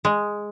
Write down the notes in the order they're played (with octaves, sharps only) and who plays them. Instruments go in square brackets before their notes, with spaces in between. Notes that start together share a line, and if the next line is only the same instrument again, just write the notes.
[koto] G#3